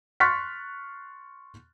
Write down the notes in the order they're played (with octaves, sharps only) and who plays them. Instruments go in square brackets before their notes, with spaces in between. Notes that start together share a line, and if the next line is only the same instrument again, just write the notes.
[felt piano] C6 C#6 F6 F#6 A6 B6